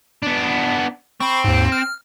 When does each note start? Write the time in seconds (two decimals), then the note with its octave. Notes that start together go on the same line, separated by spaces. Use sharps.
0.23 B3 D4
1.20 C4 B5 C#6
1.44 D#2 G#2
1.72 F6